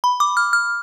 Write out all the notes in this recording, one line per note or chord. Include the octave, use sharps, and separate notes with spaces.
B5
D6
F6
F6